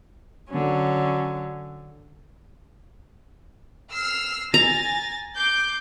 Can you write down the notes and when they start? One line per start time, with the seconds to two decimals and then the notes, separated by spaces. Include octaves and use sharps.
0.50 D3 F#3 C#4
3.90 E6 F6 C7
4.54 G#5 A#5 A6 A#6
5.35 D6 G6 C7